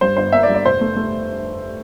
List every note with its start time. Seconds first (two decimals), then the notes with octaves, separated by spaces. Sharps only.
0.01 G2 C5
0.17 G1 C5
0.32 A#3 E5
0.43 D5
0.49 G2
0.55 D5
0.65 F1 C5
0.81 A3
0.96 A3